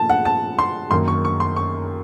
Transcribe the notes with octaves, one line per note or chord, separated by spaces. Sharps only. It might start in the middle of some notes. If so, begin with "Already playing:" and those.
Already playing: A#2 F3 A3 A5
F#5
A5
C6
F#2 D#3 A#3 D#4 C6
C#6
C#6
C6
C#6